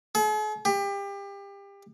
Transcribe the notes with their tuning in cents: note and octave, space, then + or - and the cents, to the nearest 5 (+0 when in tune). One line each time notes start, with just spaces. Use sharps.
G#4 +45
G4 +30